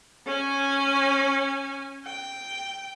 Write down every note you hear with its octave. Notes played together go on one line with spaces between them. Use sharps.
C#4 G#5
G5